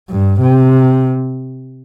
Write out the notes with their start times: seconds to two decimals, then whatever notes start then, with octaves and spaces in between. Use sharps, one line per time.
0.10 G2
0.41 C3